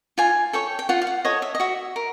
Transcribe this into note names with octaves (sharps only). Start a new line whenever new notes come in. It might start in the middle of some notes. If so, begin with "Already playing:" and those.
F4 G#5
A4 C#5 G5
G5
F4 F#5
F5
F#5
A4 C#5 D#5
E5
D#5
F#4 E5
A#4